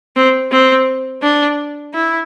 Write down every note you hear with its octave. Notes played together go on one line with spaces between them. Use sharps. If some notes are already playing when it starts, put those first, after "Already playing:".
C4
C4
D4
E4